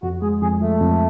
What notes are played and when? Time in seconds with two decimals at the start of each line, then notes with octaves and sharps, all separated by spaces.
0.03 F2 F#4
0.22 G#3 G#4
0.42 F2 G#4
0.61 F3 A3
0.81 F2